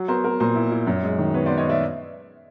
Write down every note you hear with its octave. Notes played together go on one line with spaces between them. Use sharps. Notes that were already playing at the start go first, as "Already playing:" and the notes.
Already playing: F#3
B3 A#4 C5
B3 A#4
A#2 A#4 C5
E4
E4
F#2
G#3
D#3
B3 B4 C#5
C5 D5
B3
C#5 D#5
D5 E5